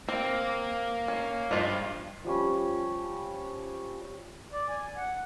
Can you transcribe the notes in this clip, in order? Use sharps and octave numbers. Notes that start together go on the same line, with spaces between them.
A#3 C4
C#4
G2 F3 G#3 F4
F3 G3 C#4
D5
G#5
F#5